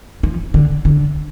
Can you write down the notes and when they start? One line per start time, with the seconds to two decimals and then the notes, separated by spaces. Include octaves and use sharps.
0.23 F3
0.54 D3
0.85 D3